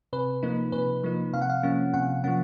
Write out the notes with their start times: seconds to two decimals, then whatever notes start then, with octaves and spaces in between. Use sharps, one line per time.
0.13 C3 B4
0.43 F3 A#3 D#4
0.72 C3 B4
1.03 F3 A#3 D#4
1.33 C3 F5
1.42 F#5
1.50 F5
1.63 F3 A#3 C#4
1.94 C3 F#5
2.24 F3 A#3 C#4 F#5